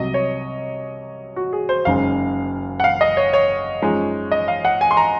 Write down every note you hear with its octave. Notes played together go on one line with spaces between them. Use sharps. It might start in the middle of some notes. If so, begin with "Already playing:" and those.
Already playing: C2 C3 F#3 D#5
C#5
F#4
G#4
C5
F#1 F#2 C#3 G#3 D#4 F5
F#5
F5
D#5
C#5
C#5
F#2 F3 G#3 D#4
D#5
F5
F#5
G#5
C6
A#5